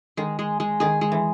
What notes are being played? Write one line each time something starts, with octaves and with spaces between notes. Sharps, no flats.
D#3 G#3
G#3
G#3
D#3 G#4
G#3
E3